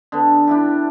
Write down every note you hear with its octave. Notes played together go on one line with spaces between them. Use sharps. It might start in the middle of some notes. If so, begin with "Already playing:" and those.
D3 B3
D4 E4 G4